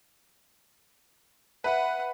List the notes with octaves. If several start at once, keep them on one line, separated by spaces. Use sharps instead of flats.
B4 E5 F#5